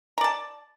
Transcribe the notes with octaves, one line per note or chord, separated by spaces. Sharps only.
D5 A5 A#5